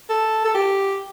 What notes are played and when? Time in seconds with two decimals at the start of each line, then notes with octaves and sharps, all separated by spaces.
0.09 A4
0.45 A4
0.55 G4